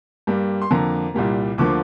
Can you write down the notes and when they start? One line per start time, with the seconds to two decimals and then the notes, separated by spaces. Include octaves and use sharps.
0.27 G2 G3 A#3
0.61 C6
0.71 F2 D3 A#3 A#5
1.14 C2 A#2 G3 A#3
1.58 D2 D3 F3 A#3 D6